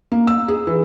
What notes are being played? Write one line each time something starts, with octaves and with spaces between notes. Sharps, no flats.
A#3
E6
G#4
E3